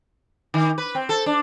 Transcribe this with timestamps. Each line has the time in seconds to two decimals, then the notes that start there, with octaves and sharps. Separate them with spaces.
0.54 D#3
0.78 B4
0.95 C4
1.09 A4
1.26 D4